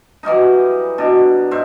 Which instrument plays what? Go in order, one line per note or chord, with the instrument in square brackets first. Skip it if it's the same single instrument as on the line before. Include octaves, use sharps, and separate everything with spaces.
[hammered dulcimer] E3 F#3 G3 D#4
B2 D4
G#2 C5 E5